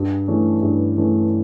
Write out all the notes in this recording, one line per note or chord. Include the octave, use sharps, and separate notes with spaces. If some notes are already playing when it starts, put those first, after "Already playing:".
Already playing: G2
E3 A3 C#4
G2
E3 A3 C#4